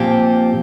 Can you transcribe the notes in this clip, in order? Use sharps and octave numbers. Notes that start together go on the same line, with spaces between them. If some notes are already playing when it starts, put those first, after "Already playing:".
Already playing: A#2 F3 C4 G4